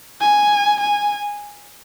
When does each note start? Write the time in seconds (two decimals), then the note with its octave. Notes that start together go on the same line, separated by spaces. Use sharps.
0.21 G#5
0.81 G#5